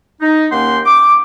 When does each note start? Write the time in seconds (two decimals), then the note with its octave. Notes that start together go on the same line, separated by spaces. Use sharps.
0.22 D#4
0.52 D#2 A#3 C#4 F#5 G5 C6
0.85 D6